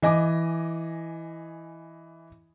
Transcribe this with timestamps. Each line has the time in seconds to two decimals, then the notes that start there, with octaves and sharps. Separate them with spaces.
0.02 E3 D#5 G#5 D6